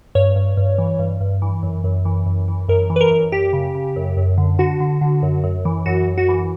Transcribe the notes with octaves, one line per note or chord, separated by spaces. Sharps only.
G2 C#5
G2
G2
E3
G2
G2
E3
F#2
F#2
E3
F#2
E3
F#2 A#4
E3
B4
A#4
F#2
F#2 G4
C#3
C#3
F#2
F#2
D3
D3 F#4
D3
D3
F#2
F#2
E3
F#2 F#4
F#2
F#4
E3